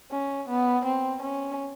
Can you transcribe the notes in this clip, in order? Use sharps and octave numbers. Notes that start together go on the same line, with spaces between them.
C#4
B3
C4
C#4